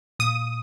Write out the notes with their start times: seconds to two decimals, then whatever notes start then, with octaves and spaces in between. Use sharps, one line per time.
0.20 A#2 D#6